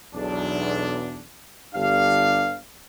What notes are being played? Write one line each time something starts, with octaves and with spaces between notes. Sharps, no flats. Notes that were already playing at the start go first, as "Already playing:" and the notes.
B1 E2 D4
G1 D4 G4 F5